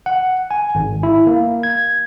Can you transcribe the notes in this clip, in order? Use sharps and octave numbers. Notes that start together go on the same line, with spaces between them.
F#5
G#5
G#1
E4
A#3
G#6